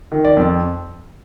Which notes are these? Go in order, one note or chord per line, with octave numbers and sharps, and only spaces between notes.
D#3
D5
F2